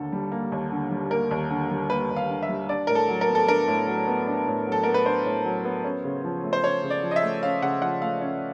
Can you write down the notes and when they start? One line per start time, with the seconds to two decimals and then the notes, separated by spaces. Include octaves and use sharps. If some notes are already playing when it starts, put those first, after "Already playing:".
Already playing: D#2 D3 A#3 A4
0.12 G3
0.32 A#3
0.52 D#2
0.72 D3
0.91 G3
1.11 A#3 A#4
1.31 D#2
1.50 D3
1.70 G3
1.89 A#3 B4
2.10 D#2
2.17 F5
2.29 D3
2.43 E5
2.49 G3
2.69 D4 D5
2.87 A2 A#4
2.95 A4
3.09 F#3
3.21 A#4
3.28 B3
3.35 A4
3.48 D4 A#4
3.67 A2
3.87 F#3
4.07 B3
4.27 D4
4.47 A2
4.66 F#3
4.72 A4
4.83 B3 A#4
4.94 B4
5.06 D4 C5
5.25 A2
5.45 F#3
5.65 B3
5.84 C#4
6.05 C#3
6.24 F3
6.44 A3
6.53 C5
6.64 C#4 C#5
6.83 C#3
6.90 D5
7.03 F3
7.11 D#5
7.16 E5
7.23 A3
7.43 C#4 F5
7.62 C#3 F#5
7.82 F3 F#5
8.02 A3 F5
8.22 C#4